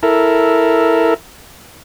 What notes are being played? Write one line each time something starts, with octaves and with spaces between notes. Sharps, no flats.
E4 A4 A#4